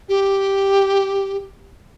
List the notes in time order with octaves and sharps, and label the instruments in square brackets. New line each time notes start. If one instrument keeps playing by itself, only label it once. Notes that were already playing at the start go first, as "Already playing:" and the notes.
[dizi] G4